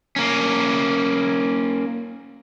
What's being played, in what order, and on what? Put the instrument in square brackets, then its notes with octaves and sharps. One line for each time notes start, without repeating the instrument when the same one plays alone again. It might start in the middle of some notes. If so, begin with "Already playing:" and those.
[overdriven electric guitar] A#3 C#4